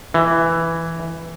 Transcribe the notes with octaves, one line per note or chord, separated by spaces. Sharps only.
E3